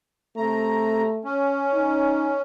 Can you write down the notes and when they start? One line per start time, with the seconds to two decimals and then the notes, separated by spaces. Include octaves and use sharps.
0.37 C3 A3 A#5
1.25 C#4
1.73 D#4